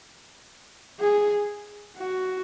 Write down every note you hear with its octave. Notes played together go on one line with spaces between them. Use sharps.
G#4
F#4